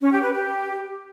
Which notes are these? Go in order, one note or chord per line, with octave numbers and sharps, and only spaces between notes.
C#4
G4
B4
G4